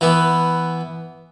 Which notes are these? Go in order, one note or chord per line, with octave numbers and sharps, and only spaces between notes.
E3 B3